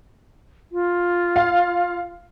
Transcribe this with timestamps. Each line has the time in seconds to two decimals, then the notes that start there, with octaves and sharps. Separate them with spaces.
0.72 F4
1.36 F5